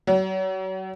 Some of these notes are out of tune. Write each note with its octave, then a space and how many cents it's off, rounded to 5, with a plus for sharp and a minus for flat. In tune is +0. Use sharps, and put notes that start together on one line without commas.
F#3 +40